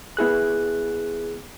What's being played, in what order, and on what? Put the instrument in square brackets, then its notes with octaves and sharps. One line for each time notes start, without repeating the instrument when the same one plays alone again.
[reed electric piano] B3 E4 G#4 F#6